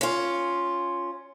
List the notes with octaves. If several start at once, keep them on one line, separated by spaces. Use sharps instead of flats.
C#4 F4